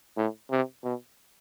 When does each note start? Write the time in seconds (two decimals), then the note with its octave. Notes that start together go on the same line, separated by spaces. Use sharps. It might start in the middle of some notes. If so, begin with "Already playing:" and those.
0.17 A2
0.51 C3
0.84 B2